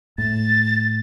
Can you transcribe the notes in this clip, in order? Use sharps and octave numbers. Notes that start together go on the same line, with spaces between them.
A2 A6